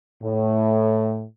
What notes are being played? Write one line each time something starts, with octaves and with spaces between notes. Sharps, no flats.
A2